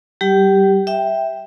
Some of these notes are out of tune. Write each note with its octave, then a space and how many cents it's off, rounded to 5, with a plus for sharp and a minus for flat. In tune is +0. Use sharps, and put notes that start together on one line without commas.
G3 -35 G4 +0 G5 -35
E5 +0 G5 +0